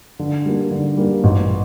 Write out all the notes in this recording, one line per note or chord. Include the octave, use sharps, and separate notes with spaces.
D3
G3 A#3
D3
G3 A#3
A1